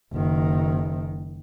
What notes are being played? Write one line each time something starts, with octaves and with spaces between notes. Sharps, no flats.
F#1 D#3